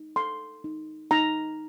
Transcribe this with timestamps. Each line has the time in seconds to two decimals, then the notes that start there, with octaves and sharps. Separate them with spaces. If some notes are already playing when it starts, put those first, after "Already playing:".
Already playing: D#4
0.16 A4 C6
0.64 D#4
1.11 D#4 A#5